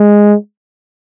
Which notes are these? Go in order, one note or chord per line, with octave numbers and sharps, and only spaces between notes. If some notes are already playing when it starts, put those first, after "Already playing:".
Already playing: G#3